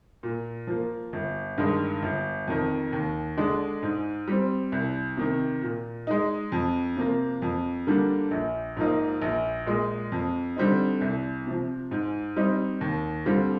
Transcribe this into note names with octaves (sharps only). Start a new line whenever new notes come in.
A#2
F3 A#3
G1
G2 D#3 G#3
G1
F2 D#3
D#2
D3 G#3 D4
G#2
G3 C4
C2
C3 D#3
A#2
G#3 D#4
F2
C3 F3 A#3 F4
F2
D3 G3 A#3 D4
A#1
G#2 F3 A#3 D#4
A#1
A#2 G#3
F2
D3 G3 C4 D#4
C2
C3 F3
G#2
G3 C4 D#4
D#2
D3 G3 C4 F4